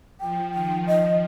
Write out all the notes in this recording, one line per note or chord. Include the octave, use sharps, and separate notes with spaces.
F3 G5
D#3 G5
F3 D#5